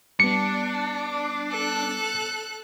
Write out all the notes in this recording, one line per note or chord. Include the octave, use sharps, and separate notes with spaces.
G3 B3 D4 C#7
A4 F#6